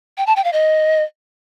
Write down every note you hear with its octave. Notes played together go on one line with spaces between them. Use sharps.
G5
A5
G5
F5
D#5